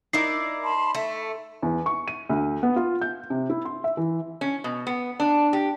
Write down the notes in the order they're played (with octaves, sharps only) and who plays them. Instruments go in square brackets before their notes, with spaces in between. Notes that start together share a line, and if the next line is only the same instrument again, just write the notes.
[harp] D#4 D6 [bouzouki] E4 A#4 D5 [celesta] C7
[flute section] A5 B5 C6
[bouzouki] A3 [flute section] E5
[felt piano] E2
C#6
D#7
D2
B3
F4
G6
C3
E4
C6
E5
E3
[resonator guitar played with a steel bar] C#4
B2
B3
D4
G4